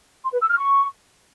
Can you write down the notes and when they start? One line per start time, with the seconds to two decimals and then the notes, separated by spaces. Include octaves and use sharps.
0.23 C6
0.32 B4
0.40 E6
0.49 F6
0.57 C#6